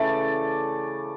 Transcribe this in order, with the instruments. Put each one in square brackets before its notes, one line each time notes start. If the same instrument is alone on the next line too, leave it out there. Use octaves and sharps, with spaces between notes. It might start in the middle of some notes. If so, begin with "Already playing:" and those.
Already playing: [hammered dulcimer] C#3 E3 A3 D5